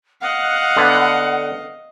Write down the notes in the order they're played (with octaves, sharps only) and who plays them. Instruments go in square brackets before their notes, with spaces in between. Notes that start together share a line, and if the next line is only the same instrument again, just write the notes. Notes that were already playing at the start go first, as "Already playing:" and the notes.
[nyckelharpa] D#5 F5 [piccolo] F#5
[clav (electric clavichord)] D3 B3